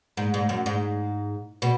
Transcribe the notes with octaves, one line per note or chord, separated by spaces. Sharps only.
G#2
G#2
F#2
G#2
B2